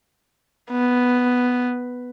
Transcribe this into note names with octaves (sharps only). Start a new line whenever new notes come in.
B3